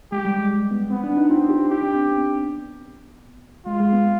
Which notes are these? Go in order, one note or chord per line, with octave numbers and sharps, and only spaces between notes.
G#3 G4
G3
G#3
B3
B3 C4
D4
D#4
C4 F4
G4
D#4 G4
D4
C4
B3
G#3 F4
G#3
B3